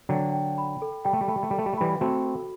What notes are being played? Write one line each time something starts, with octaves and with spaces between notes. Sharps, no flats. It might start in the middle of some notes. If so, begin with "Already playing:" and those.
D3 F#3 G5
G5
B5
A4
G3 G5
A3
G3
A3 B5
G3
A3
G3 A4
A3
G3
A3
E3 G3 B5
A3 C4 F#4
A4